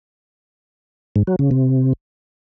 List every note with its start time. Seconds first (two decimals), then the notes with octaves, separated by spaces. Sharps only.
1.16 G#2
1.27 F#3
1.39 C#3
1.51 C3